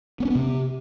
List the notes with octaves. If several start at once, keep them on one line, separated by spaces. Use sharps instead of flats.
B3
C#4
B3
C3